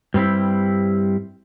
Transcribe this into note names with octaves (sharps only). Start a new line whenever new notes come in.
G2 G3 C4 E4